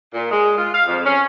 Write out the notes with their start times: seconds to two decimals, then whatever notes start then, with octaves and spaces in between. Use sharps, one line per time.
0.14 A#2
0.31 G#3
0.58 F4
0.74 F5
0.87 F2
1.05 C#4